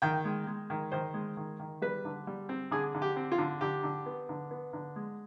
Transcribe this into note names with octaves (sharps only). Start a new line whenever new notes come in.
D#3 G5
G#3
G#3
D#3
D#3 C5
G#3
D#3
D#3
G3 B4
D3
G3
C4
D3 G#4
D3
G4
C4
F4
D3
D3 G4
D3
B3
D3
B3
D3
G#3